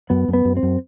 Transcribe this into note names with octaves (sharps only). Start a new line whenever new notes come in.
F#2 B3
F#2
B3
F#2
C4
F#2